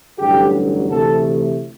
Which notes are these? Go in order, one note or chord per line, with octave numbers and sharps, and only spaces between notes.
A1 G2 D3 F#3 G4
D2 C3 E3 A3 A4